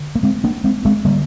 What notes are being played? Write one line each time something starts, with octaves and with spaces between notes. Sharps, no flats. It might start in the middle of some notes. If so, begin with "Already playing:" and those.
Already playing: D3
A#3
G#3 C4
A#3 D4
G#3 C4
G#3 C4
D3 G3 A#3